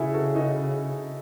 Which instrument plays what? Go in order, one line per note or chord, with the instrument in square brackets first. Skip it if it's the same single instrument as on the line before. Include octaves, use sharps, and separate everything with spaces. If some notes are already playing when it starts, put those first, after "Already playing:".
Already playing: [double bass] C#3 [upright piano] E4 F#4 G#4 A4
[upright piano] F#4 A4
D#4 F#4